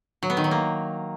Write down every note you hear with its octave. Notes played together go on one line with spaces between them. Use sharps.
F#3
B3
D#3
F#3
A#3